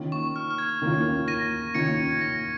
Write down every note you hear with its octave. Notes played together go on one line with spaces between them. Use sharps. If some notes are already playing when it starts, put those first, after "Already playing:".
Already playing: D#3 A#3 C#4 F4
C#6
F6
F6
G#6
D#3 A#3 C#4 F4
A#6 D#7
D#3 A#3 C#4 F4 G#6 C#7
A#6